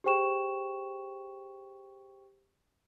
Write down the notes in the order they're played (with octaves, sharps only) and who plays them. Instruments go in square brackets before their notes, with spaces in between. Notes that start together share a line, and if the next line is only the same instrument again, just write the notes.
[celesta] G4 G#4 C5 G5 C#6 E7